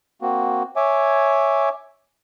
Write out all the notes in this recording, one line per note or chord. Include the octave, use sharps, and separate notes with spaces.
A#3 C4 F#4
C#5 E5 G#5 D6